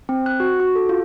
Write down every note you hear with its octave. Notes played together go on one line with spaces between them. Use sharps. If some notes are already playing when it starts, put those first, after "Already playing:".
C4
F#6
F#4
F#4
A4
F4